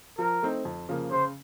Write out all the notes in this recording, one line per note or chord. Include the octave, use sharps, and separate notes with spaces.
F3 A#4
A3 C4 D#4
F2
C#3 F3 A#3
C#3 C5